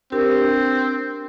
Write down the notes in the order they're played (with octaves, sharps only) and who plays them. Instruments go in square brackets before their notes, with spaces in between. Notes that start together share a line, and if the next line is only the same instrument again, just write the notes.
[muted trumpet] C4 [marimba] D4 G4 A#4